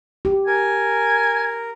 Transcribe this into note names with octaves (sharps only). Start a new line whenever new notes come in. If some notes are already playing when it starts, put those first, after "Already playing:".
G4
A#4 G#5